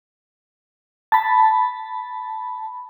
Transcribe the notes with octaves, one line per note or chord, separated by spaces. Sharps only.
A5 B5